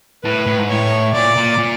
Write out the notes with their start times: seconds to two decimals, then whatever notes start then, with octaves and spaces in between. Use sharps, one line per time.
0.24 A2 B4
0.46 A2
0.59 G#2
0.69 A2 C#5
1.14 A#2 D5
1.37 A#2
1.58 A#2